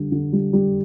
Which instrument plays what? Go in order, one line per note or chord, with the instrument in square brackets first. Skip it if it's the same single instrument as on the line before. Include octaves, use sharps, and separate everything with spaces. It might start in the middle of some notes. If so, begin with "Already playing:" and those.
Already playing: [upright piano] D3 G3
D3
G3
G3